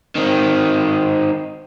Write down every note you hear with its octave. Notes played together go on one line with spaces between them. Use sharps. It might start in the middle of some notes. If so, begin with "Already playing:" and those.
D#3 C4